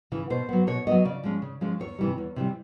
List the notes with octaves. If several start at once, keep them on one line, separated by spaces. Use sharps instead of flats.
C#3 E3
B2 C5
F#3 B3
B2 C#5
F#3 B3 D#5
C#3 D5
F3 G#3 C#4
C#3
F3 G#3 C#4
E2 C#5
C3 E3 G3
E2
C3 E3 G3